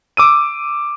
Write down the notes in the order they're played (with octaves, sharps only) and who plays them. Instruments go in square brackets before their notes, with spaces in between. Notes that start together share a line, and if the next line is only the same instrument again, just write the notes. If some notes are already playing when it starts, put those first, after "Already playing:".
[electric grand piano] D6 E6 D#7